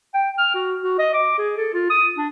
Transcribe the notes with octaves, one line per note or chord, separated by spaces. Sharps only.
G5
F6
F#4
F#4
D#5
D6
G#4
A4
F4
D#6
D4